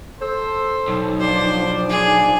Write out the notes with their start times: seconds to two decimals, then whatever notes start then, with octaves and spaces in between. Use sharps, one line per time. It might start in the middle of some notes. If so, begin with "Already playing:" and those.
0.20 A4 C5
0.88 B1 D#4
1.20 F3 D4 C5 D5
1.90 G#4